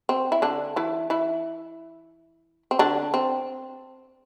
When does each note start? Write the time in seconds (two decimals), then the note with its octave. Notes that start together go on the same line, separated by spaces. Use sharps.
0.09 C4
0.32 E4
0.42 D3 D4
0.76 E3 E4
1.10 E3 E4
2.71 C4
2.79 D3 D4
3.14 C4